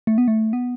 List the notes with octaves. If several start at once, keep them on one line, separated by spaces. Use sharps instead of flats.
A3
B3
A3
B3